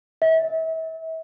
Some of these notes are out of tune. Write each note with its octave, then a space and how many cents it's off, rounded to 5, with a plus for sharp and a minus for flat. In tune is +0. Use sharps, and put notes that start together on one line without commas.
E5 -35